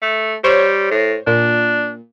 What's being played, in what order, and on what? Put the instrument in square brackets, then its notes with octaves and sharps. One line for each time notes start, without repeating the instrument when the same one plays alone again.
[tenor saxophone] A3
[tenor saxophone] G3 [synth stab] C5 C#5
[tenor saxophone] A2
[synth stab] A#2 [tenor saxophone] D4